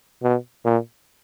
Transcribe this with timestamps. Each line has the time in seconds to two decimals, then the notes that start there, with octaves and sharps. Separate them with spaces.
0.23 B2
0.65 A#2